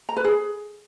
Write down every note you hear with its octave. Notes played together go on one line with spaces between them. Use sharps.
A#5
B4
G#4